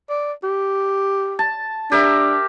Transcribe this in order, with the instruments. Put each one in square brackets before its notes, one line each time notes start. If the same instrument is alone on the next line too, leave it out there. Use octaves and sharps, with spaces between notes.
[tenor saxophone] D5
G4
[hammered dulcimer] A5
[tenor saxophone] D4 [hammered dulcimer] G4 A#4 E5